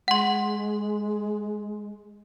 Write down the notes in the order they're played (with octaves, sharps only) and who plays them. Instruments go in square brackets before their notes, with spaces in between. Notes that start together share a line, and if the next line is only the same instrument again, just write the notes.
[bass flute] G#3 [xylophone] F#5 C6